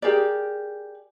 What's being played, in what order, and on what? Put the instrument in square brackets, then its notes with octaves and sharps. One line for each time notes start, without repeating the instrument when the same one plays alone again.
[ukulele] G4 G#4 A#4 D5